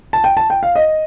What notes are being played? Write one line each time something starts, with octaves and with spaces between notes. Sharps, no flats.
A5
G5
A5
G5
F5
D#5